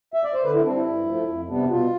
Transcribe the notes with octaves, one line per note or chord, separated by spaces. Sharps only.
E5
D5
C5
D3 B4
E4
G3 C4 D4
E4
G2
F3 A3
F2
C3 G3 B3 D4
B2 F4